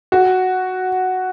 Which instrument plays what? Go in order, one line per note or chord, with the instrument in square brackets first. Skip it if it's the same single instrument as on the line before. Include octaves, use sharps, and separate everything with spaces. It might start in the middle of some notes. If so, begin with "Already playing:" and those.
[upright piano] F#4